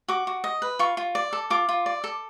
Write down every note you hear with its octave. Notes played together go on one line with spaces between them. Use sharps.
F#4 D6
F#4
D#5
B4
F4 C#6
F4
D5
A4
F4 D6
F4
D5
A4